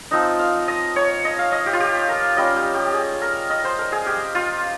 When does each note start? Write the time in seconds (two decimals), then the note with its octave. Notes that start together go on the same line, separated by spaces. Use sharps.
0.11 F3 C4 D#4 D#5
0.39 F5
0.68 D#5
0.96 C#5
1.25 D#5
1.39 F5
1.52 D#5
1.66 G4
1.73 F4
1.80 G4
2.09 A#4
2.37 G3 C#4 F4 D#5
2.56 G4
2.74 G4
2.93 G#4
3.21 A#4
3.50 D#5
3.64 C5
3.79 A#4
3.92 G#4
4.06 G4
4.35 F4